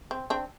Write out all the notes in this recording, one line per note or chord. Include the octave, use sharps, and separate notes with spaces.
C4
C4 D4